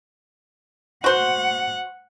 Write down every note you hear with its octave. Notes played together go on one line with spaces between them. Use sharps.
F#4 C5 F#5